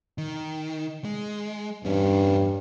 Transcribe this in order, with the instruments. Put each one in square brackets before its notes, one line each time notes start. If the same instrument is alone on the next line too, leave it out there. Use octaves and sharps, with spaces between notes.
[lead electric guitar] D#3
G#3
[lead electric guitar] E2 C#4 [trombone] G2